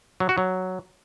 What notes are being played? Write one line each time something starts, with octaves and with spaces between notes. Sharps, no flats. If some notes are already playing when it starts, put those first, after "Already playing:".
F#3
F#4
F#3